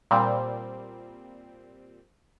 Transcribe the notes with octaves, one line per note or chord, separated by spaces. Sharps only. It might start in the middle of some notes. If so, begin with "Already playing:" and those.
A#2 G3 C4